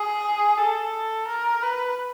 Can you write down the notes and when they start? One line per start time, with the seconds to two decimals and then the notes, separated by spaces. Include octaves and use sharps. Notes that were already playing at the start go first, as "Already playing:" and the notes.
Already playing: G#4
0.58 A4
1.27 A#4
1.62 B4